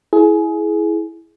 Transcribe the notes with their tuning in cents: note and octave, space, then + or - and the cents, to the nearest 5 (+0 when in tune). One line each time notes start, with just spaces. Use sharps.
E4 +0 G#4 +20